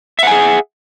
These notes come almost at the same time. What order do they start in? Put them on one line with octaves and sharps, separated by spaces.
E5 F#5 G#5 G#4